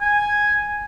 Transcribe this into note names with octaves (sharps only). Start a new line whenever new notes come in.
G#5